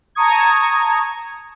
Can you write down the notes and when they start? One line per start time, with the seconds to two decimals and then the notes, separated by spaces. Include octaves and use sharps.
0.15 A5 A#5 C#6 D#6 G#6